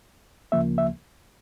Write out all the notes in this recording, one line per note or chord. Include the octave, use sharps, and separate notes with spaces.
D2 C#3 F3 A#3 E5
E5